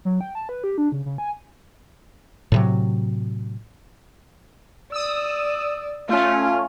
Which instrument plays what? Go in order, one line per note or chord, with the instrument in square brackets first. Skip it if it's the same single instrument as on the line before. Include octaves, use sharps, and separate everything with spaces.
[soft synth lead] F#3
G5
A5
B4
G4
D4
C#3
C#3
G#5
[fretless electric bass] A2 C3 F#3
[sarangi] D5 [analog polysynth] D#6 E6
[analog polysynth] A3 C#4 [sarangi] F4